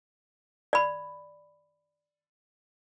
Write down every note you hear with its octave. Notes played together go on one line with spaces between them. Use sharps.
D5 B5